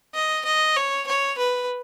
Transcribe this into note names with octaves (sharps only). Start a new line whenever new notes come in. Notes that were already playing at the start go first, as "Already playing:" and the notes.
D#5
D#5
C#5
C#5
B4